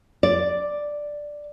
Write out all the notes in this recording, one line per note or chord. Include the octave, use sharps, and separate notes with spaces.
D5